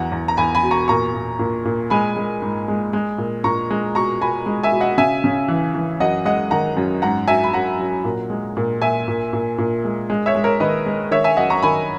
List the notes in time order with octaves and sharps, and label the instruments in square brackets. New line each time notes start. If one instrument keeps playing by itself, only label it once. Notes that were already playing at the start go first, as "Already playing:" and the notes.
Already playing: [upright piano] E2 F#3 F#5 A#5
E2
A#5
E2 G#5 B5
G#5 B5
B2
A#5 C#6
A#2 A#5 C#6
A#2
A#2
A#2
G#3 G#5 B5
G#3
G#2
G#3
G#3
A#2
A#2 A#5 C#6
G#3
B2 A#5 C#6
B2 G#5 B5
G#3
E5 G#5
B2
D#5 F#5
C#3 E5 G#5
C#3
E3
E3
F#2 D#5 F#5
G#3 D#5 F#5
D#3 F#5 A#5
F#2
G#2 F#5 A#5
F#3 E5 G#5
B5
F#3 F#5 A#5
F#3
A#2
G#3
A#2
A#2 E5 G#5
A#2
A#2
A#2
G#3
G#3
C#5 E5
G#3
A#4 C#5
D#3 B4 D#5
G#3
D#3 C#5 E5
E5 G#5
F#2 D#5 F#5
A#5 C#6
D#3 G#5 B5